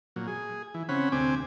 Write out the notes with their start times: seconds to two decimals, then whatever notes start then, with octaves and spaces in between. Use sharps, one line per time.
0.16 A#2 F#3
0.28 G#4
0.74 E3
0.89 C#3 C4 C#4 F#5 B5
1.12 D2 C3 C4 G#5 D6